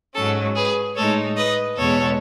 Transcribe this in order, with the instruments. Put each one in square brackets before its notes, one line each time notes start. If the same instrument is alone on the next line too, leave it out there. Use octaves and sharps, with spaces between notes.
[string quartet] G#2 F#3 C#4 A4
G#4 B4
A2 G#3 D#4 A4 C#5
B4 D#5
E2 B2 G#3 B3 A4 C#5